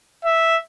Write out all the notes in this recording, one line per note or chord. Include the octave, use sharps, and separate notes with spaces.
E5